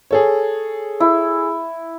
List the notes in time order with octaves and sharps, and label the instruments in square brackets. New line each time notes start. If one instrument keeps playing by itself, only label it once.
[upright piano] G#4 A4 C#5
[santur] E4